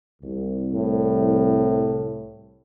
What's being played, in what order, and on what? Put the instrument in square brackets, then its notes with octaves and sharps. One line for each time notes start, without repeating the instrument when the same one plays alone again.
[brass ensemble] C2
[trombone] A2